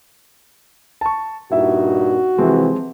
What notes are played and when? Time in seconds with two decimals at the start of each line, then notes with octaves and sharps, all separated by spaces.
1.01 A5 C#6
1.52 G2 A#2 D#4 E4 F#4 E5
2.38 C3 E3 F3 G#3 C4